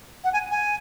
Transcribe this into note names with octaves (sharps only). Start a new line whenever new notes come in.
F#5
G#5
G#5